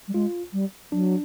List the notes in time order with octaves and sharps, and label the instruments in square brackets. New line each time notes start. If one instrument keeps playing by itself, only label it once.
[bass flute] G3
[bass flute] G#3 [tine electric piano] F4
[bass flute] G3
[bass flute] F#3 [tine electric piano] D4